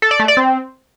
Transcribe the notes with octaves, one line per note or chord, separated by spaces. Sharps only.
A4
D5
A3
D5
C4